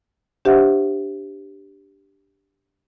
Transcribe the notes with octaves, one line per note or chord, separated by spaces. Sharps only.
D4 G4 C5 E5 F#5